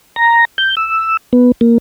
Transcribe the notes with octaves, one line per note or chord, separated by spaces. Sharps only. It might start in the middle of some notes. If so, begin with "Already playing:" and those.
A#5
G6
E6
B3
A#3